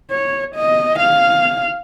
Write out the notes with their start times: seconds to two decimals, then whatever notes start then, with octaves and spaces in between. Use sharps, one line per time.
0.11 C#5
0.55 D#5
0.99 F5